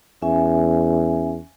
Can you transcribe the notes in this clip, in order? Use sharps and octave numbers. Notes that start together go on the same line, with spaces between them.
E2 C#4 E5 G#5